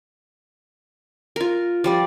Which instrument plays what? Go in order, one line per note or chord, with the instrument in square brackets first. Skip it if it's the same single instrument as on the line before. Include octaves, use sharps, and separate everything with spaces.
[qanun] F4 A#4
F3 G3 D5